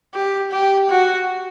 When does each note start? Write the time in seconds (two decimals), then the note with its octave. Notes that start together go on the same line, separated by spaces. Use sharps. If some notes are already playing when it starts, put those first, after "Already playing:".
0.14 G4
0.51 G4
0.89 F#4